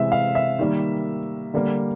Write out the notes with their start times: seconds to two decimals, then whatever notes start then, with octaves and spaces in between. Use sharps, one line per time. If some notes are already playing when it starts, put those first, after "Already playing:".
Already playing: C3 E3 G#3 E5
0.12 F5
0.35 E5
0.59 D#3 G3 A#3
1.54 D3 G3 A#3